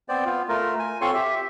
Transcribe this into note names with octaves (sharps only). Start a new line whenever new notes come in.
B3 C4 C5 D5
B3 F4
A3 F4 A#4
G#5
C4 F4 A4 C#5 C6 C#6
G4 E5